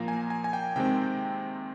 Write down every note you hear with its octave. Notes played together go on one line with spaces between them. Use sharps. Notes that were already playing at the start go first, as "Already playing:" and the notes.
Already playing: A#2 F3 A#3 A#5
G#5
G#5
G#5
G5
C3 D#3 G#3 C4 G5